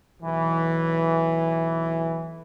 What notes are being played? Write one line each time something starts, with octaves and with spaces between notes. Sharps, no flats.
B1 E3